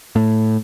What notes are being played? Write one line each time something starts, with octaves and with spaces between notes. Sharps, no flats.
A2